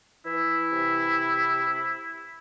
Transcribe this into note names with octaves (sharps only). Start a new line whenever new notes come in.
E3 E4
C3